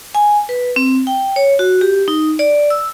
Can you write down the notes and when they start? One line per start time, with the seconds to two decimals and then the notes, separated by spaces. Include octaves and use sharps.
0.15 G#5
0.49 B4
0.76 C4
1.07 G5
1.36 C#5
1.59 F#4
1.81 G4
2.08 D#4
2.39 D5
2.70 E6